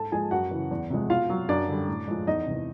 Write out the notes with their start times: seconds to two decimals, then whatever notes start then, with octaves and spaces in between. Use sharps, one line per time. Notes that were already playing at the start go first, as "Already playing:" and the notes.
Already playing: G#2 A4 A5
0.12 F3 G#3 G#4 G#5
0.31 F#2 F#4 F#5
0.51 C#3 E3
0.71 E2
0.90 C3 F3 G#3
1.10 B2 F4 F5
1.30 F#3
1.49 F#2 D4 D5
1.69 D3 G3
1.88 A2
2.08 F3 G#3
2.27 E2 D#4 D#5
2.47 C3 E3